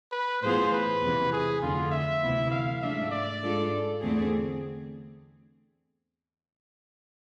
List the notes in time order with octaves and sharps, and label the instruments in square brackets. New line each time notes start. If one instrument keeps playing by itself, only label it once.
[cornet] B4
[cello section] A2 E3 B3 F4 G#4 [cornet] C5
[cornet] B4
[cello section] E2 C3 E3
[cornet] G#4
[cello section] F2 D3 A3 [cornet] F4
[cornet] E5
[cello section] D2 C3 E3 B3 E4
[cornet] F5
[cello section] G#2 F3 A3 D4 [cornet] E5
[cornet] D5
[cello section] G#2 G#3 D4 F4 A4
E2 D3 A3 C4 G#4